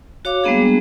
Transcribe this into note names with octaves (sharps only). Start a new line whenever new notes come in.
F#4 C#5 F5 D6
G3 G#3 A#3 B3 D4 G#4